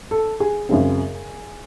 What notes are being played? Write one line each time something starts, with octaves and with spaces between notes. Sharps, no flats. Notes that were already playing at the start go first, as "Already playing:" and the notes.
A4
G#4
F#2 C#3 G#3 C4